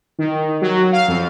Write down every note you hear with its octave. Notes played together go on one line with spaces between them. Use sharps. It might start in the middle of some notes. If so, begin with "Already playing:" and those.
D#3
F#3
F5
F2